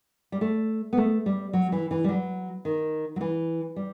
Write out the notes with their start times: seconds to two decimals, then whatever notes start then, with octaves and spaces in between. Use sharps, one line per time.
0.32 G3
0.41 A3
0.93 B3
0.97 A3
1.26 G3
1.53 F#3
1.72 E3
1.91 E3
2.04 G3
2.09 F#3
2.65 D#3
3.16 F#3
3.21 E3
3.76 G3